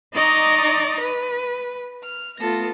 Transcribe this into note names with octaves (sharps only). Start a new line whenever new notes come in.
D#4 D5 D#5 A#5 C#6
B4
F6
A3 B3 F4 A4 A#6